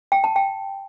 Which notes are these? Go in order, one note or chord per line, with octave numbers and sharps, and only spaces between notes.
G5
A5
G5